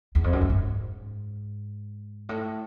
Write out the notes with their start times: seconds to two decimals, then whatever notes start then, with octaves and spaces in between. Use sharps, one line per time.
0.15 E2
0.24 F2
0.33 F#2
0.42 G2
0.50 G#2
2.29 A2